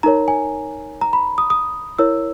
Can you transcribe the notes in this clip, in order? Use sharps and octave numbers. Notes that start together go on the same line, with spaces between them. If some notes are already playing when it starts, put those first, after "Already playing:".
D#4 A#4 C#5 A#5
G#5
A#5
B5
D#6
D#6
E4 A#4 C#5 E6